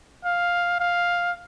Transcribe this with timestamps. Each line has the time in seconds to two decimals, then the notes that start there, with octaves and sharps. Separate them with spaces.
0.25 F5
0.80 F5